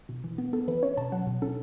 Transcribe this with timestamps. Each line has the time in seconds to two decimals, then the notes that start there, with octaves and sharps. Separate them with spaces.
0.09 B2
0.24 E3
0.38 B3
0.53 B3 A4
0.68 E3 B4
0.83 C#4 C#5
0.97 B2 A5
1.12 F#3 F#5
1.27 B2
1.42 C#4 A4